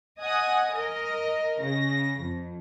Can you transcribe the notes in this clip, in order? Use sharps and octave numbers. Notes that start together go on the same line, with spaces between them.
D#5 F#5 G#5 D#6
A#4 D#5
C#3 A#6
F2